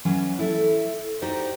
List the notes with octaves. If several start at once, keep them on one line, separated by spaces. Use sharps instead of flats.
E3 F#3 C#4
E4 A4 E5
D#4 F#4 G4 C5 D5